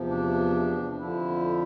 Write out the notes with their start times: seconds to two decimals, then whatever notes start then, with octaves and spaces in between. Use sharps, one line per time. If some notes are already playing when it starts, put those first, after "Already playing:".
Already playing: E2 C3 F3
0.09 D4
0.99 F2 D3 F3 E4